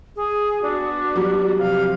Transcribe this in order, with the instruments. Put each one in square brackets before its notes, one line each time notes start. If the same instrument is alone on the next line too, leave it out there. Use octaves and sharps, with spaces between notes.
[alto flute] G#4
[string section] B3 F#4 [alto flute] D4
[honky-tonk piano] F#3 G3
[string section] C3 F3 [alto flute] F5